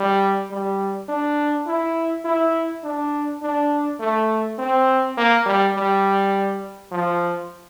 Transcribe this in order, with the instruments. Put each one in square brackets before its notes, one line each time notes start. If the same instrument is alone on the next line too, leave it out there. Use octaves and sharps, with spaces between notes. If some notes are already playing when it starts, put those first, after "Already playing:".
Already playing: [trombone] G3
G3
D4
E4
E4
D4
D4
A3
C4
A#3
G3
G3
F3